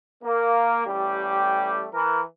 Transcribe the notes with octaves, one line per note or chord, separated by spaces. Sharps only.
A#3
A1 G3 A3 G4
E3 A#4